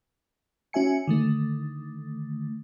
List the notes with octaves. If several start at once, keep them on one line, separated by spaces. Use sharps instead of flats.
C#4 F#4 E5 G#5 C#7
D3 D#3 A3